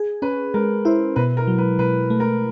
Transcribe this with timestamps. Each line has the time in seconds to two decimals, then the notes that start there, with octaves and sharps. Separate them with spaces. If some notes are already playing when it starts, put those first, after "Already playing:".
Already playing: G#4
0.22 C#4 B4
0.54 G#3 A#4
0.85 E4 C5
1.16 B2 B4
1.37 A#4
1.47 F#3
1.58 B4
1.79 B2 B4
2.10 A3
2.20 A#4